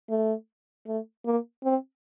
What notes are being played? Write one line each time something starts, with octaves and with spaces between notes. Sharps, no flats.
A3
A3
A#3
C4